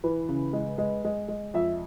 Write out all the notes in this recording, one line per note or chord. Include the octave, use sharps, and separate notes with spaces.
E3 B4
C#3
G#3
G#3
G#3
G#3
F2 E5